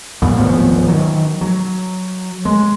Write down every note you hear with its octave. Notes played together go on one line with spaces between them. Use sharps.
A1 A2 G3 B3
D1 G#1 F3 B3
D#3 F#3
F#3
G#3